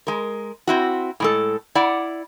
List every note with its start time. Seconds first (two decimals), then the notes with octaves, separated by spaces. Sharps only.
0.07 G#3 A#4
0.67 C4 E4 F#4
1.20 A2 G#3 A4
1.75 E4 D5 F#5